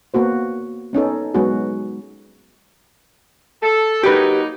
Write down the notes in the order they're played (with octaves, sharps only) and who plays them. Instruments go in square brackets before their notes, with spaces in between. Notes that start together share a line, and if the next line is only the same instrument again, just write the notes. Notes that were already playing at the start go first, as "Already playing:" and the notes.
[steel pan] A#3 B3 F#4 C5
B3 C#4 D#4 A4
F#3 G#3 B3 D#4 F#4 G#4
[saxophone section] A4
[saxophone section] F#3 A#3 D#4 [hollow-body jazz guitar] G4 B4